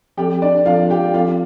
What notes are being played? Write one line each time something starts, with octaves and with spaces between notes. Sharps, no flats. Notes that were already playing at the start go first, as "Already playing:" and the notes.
F3 C4 G4 A4 G5
D4 D5
F3 C4 F4 A4 F5
G4 G5
F3 C4 F4 A4 F5